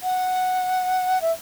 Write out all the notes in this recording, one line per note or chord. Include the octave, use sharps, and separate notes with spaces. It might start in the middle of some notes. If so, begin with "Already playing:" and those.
F#5
E5